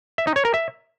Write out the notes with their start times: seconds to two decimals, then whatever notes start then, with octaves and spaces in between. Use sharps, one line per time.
0.18 E5
0.27 D#4
0.36 C#5
0.45 A#4
0.54 E5